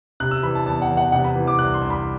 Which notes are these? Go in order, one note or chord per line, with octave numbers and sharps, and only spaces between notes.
C3 F#6
E6
E3 B5
A5
E2 A5
F#5
E2
F#5
C3 F#5
B5
E3
D6
C2 F#6
C6
C2
B5